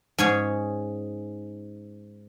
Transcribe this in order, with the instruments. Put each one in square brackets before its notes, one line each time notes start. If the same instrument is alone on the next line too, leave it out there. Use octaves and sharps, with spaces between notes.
[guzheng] G#2 C#4 G#4 C#5